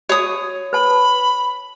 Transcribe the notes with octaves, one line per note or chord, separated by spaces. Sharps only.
F#4 C#5 D#6
B4 A5 B5